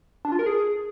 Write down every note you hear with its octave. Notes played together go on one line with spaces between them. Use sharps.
D4
F4
A#4
G#4